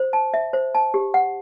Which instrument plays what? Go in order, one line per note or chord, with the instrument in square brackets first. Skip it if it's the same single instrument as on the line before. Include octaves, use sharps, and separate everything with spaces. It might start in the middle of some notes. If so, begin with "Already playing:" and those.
Already playing: [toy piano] C5
A5
E5
C5
A5
G4
F#5